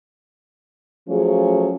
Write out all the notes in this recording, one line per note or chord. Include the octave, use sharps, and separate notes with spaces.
F3 F#3 A3 C#4 F4 G#4